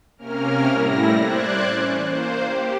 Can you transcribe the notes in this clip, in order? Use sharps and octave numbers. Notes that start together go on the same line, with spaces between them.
C3 A#3 C#4 A#4 F6
A2 G3 E4 A#6
C5 D5 F#6 G#6
E3 C#4
A#3 C5
G4